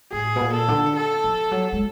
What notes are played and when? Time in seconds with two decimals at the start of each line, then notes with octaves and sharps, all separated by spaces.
0.12 A2 G#4
0.36 B2
0.41 A#2
0.54 A4
0.68 D3
0.97 A4
1.24 F3
1.52 F#3
1.73 G#3